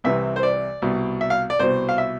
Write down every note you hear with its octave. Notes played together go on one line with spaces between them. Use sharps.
C2 C3 E3 E5
C5
D5
C2 B2
E5
F5
D5
C2 B2 C5
F5
E5